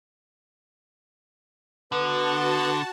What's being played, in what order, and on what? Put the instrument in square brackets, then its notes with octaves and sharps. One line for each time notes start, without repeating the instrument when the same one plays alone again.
[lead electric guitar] D3 [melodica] B3 F#5 [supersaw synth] F#4 A5 [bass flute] B4